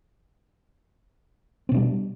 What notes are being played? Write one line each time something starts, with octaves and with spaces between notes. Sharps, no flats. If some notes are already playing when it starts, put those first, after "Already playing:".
B2 G3 C4 D4